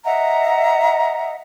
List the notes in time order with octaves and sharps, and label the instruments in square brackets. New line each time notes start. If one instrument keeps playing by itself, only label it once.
[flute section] D#5 E5 F#5 A#5